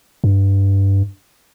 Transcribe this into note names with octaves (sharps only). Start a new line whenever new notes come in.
G2